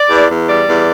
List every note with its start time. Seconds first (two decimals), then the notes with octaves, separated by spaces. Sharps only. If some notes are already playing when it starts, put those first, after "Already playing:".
Already playing: D5
0.10 E2
0.29 E2
0.48 G3 D5
0.67 E2